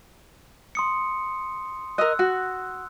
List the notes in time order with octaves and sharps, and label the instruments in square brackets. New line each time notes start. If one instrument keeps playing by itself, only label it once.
[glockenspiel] C6 D#6 C#7
[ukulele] A#4 D#5 [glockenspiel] E6 F#6
[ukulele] F#4